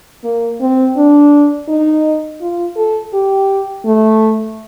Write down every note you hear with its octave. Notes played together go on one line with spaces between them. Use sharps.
A#3
C4
D4
D#4
F4
A4
G4
A3